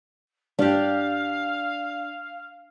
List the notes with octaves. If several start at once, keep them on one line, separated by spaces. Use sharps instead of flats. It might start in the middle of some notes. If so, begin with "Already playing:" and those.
G2 D4 G4 F5